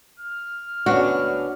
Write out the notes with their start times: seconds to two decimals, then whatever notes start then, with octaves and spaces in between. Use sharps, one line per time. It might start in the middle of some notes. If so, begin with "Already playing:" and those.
0.19 F6
0.86 D2 B3 C#4 D4 F#4